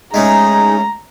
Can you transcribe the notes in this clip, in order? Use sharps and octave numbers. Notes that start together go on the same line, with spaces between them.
G#3 A3 C#4 D#4 G#4 A#5